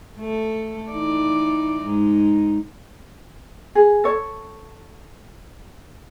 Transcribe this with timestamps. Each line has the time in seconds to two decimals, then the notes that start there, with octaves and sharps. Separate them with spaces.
0.18 A3 A4
0.91 E3 D#4 D5
1.79 G#2 D#4
3.75 G#4
4.04 A4 C#5